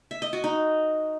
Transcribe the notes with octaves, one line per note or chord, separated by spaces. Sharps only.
E5
D#5
F#4
D#4